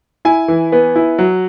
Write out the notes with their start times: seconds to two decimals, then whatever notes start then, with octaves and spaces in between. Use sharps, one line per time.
0.25 E4 G#5
0.48 E3
0.72 B3
0.96 E4
1.19 F#3